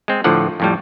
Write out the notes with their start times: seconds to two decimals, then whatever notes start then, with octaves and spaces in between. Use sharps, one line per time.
0.08 G#3 C4
0.24 A2 D3 F3 F#5
0.60 F2 A2 G3